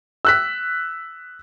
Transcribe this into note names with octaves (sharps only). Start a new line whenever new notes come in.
E6 F#6 B6